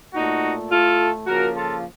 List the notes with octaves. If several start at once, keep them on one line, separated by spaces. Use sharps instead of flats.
A#2 A3 D#4 F#4
A2 A3 F4 A4
C#3 F3 A#3 F#4 A#4
F4 A4